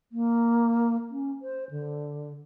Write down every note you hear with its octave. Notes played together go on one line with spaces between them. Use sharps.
A#3
C#4
C5
D3